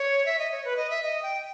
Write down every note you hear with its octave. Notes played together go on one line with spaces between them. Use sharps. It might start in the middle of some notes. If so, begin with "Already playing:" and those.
Already playing: C#5
E5
D#5
C#5
B4
D#5
E5
D#5
G5